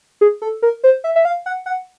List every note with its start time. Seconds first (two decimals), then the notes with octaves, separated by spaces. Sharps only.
0.21 G#4
0.42 A4
0.62 A#4
0.84 C5
1.04 E5
1.16 E5
1.25 F5
1.46 F#5
1.66 F#5